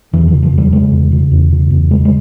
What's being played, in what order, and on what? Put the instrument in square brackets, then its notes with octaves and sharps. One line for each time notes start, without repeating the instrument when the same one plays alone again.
[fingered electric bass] E2 E3
F3
C#3
F3
E2
G3
C#3 G#3
E2
C#3
E2
C#3
E2
C#3 G#3
G#3